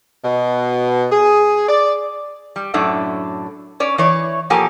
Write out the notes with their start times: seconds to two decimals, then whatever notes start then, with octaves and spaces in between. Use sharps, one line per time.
0.23 B2
1.11 G#4
1.67 D5
2.56 G3
2.74 F#2 A2 D4 A4 E5
3.80 C#4 C#5 D5
3.98 E3 C#5 D5
4.50 B2 F3 A#3 G4 A4 G#5